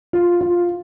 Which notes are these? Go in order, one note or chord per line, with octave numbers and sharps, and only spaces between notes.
F4
F4